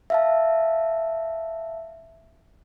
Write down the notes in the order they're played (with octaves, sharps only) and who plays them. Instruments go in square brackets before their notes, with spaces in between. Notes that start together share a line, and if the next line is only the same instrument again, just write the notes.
[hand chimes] E5 F5 A5